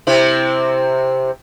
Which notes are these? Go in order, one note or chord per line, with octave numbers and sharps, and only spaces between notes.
C3 C4 E4